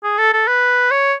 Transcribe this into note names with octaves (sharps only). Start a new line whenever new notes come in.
G#4
A4
A4
B4
C#5